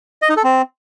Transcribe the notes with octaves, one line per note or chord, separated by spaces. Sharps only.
D#5
D#4
A4
C4